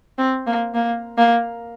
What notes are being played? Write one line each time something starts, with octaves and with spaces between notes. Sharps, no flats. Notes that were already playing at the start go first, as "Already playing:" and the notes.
C4
A#3
A#3
A#3